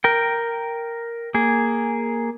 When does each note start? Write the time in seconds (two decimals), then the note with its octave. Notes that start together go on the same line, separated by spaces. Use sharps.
0.04 A#4 G5
1.34 A#3 G#4